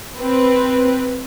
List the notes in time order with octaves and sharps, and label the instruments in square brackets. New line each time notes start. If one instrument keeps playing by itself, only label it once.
[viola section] C4 B4